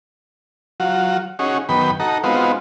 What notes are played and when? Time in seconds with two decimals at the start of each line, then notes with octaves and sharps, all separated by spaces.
0.80 F#3 F4 F#4
1.39 C#4 D#4 F#4 G#4
1.69 F#2 D#3 B3 G5 B5
2.00 D#4 F#4 A4 A#5
2.24 G#3 B3 C4 D#4 F4 F#4